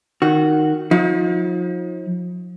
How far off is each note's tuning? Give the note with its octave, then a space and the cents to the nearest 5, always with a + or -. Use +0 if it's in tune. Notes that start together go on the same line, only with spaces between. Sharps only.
D#3 -5 F#4 +0
F3 +40 D#4 +45